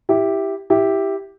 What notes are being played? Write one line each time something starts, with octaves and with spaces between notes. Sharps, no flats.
E4 G4
E4 G4